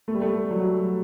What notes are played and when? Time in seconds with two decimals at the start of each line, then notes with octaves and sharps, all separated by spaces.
0.08 A3
0.14 G3
0.21 A3
0.51 F#3